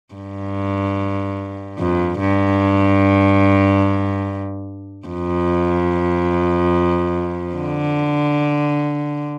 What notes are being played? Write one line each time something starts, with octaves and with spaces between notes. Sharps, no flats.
G2
F2
G2
F2
D3